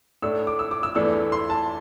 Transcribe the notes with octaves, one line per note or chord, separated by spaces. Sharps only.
A2 A3 D4 E6
D6
E6
D6
E6
E2 E3 A3 D4 E6
C6
A5